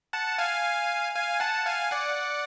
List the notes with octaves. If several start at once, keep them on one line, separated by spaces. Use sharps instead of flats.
F#5 A5
F5 G#5
F5 G#5
F#5 A5
F5 G#5
D5 F#5